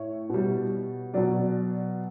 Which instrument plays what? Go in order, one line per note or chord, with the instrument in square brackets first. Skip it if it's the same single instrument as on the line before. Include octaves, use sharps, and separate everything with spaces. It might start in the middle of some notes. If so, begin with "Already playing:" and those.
Already playing: [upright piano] A2 C#5
B2 G3
B2 F#3 D5